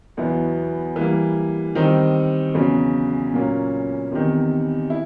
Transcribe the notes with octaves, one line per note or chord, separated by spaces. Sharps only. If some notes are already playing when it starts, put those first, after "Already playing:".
E2 B2 F#3 B3 E4
E3 G3 A#3
D#3 G3 C4 D#4
E2 C#3 F#3
A#2 F#3 A#3 C#4
E2 C3 D#3
E4